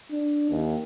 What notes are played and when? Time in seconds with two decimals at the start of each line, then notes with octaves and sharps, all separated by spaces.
0.12 D4
0.51 D#2